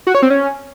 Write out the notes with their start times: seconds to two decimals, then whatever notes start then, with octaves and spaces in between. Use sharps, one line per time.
0.07 F#4
0.15 C#5
0.22 C4
0.30 C#4